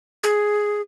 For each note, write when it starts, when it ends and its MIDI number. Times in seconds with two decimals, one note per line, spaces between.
0.23 0.81 68